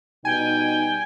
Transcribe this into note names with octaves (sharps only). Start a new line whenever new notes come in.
B2 G3 D#4 G5 G#5